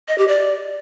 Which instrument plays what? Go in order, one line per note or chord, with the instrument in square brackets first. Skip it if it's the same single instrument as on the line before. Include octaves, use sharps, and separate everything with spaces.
[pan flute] D#5
G4
D5